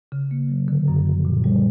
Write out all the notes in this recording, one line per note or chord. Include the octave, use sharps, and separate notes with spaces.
C#3
A#3
F#3
D3
F#2
F3
A#2
G3